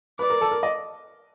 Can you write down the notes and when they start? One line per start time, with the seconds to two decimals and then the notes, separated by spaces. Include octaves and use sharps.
0.19 B4 D5
0.30 A#4
0.41 A4
0.51 A#4
0.63 D#5